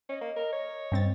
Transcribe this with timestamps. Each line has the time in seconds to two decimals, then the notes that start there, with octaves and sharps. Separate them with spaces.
0.09 C#4 D#5
0.21 A#3
0.36 A#4
0.52 C#5
0.92 G2 C4 A6